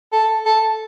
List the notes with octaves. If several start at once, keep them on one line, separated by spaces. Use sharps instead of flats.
A4
A4